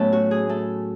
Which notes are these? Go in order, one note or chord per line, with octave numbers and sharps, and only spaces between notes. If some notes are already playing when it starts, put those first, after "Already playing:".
Already playing: A2 F#3 A3 B3 C#4 A4 B4
F#4
G#4
A3 A4